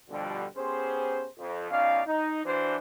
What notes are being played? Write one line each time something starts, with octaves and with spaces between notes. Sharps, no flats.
B2 D3 F3 G3
B3 C#4 G4 G#4 C5
F2
B2 C#4 D#4 D5 F5
D#4
E3 D4 F#4 C5